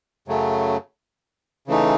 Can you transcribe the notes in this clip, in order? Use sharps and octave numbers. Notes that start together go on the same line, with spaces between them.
F#2 C#3 F#3 A3
C#3 E3 A3 D#4